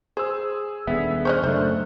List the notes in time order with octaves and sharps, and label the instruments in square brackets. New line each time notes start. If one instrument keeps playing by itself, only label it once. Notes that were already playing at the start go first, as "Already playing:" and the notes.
[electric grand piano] G#4 E6 [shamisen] C5
[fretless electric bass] D#1 D3 [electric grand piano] B3 G#4 [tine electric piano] E5
[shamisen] C5 C#5 D#5 [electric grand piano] C#6 F6 F#6
[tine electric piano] F#2 A3 [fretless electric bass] C#3 D4 [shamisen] C5